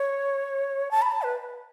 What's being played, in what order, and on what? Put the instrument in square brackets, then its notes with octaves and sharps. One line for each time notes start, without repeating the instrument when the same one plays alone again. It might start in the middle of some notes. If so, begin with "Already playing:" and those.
Already playing: [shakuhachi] C#5
A5
B5
A5
B4